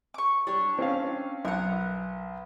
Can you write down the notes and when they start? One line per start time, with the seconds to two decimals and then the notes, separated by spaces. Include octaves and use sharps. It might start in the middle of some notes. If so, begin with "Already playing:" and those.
0.14 C#6 D6
0.47 G3 D4 C#5
0.79 C4 C#4 F5
1.45 B1 A#4 F#5